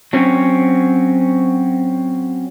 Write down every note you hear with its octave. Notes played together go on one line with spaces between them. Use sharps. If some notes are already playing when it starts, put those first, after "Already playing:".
F#3 C4 C#4